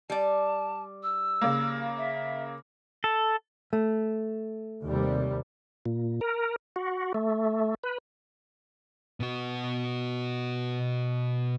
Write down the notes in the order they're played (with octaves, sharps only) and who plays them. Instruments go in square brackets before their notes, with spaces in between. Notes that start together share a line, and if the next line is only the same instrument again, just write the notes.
[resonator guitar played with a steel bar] G3 D5 [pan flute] A5
[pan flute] E6
[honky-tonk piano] C#3 A#3
[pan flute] E5
[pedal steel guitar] A4
[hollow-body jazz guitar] A3
[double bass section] D#2 C3 G3
[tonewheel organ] A#2
A#4
F#4
A3
B4
[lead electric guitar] B2 F#4